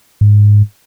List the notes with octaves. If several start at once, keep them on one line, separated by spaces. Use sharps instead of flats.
G#2